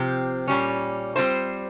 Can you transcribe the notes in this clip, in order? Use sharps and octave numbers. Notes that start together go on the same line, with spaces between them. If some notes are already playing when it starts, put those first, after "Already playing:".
Already playing: C3 F3 C4 G4
A#2 G3 C#4
G3 C4 F4 C5